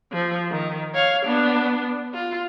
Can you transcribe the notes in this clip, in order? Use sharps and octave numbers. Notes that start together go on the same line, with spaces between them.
F3
D#3
C#5 F5
B3 D4
F4